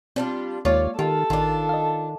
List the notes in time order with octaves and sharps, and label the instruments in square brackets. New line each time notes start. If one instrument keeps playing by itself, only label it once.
[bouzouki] G3 D4 F4 [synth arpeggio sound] C4
[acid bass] D#2 [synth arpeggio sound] G#3 A#3 [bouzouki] F4 C#5 D5
[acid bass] D#3 [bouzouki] F4 [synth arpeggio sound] G4 [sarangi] A4
[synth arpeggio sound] A1 [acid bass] D#3 [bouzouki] D4 F4
[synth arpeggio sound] D#5 F5